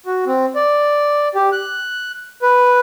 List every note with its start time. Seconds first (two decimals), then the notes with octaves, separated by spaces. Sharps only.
0.06 F#4
0.26 C4
0.55 D5
1.35 G4
1.52 F#6
2.42 B4